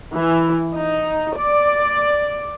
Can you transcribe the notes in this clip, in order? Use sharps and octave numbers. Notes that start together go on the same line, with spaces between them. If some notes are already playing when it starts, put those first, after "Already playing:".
E3
D#4
D5